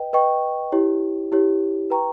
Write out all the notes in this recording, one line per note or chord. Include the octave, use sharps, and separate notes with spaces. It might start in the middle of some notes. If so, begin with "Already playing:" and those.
Already playing: B4 D#5 G5
B4 D#5 G5 C#6
E4 G4 C#5
E4 G4 C#5
B4 G5 A#5 C#6